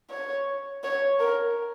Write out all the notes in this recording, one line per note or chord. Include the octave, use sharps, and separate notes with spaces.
C#5
C#5
A#4